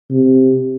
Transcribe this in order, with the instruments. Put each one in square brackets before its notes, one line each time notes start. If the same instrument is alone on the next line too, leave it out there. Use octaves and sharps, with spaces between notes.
[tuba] C3